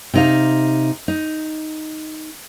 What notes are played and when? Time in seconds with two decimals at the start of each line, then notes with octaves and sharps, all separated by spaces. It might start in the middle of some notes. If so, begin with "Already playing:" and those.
0.14 C3 D#4 F5
1.08 D#4